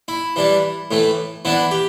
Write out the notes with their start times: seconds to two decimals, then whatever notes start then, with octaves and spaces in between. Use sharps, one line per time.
0.08 E4
0.36 E3 G3 D4
0.91 A2 E3 A3
1.45 E3 B3 D4 E4
1.71 G4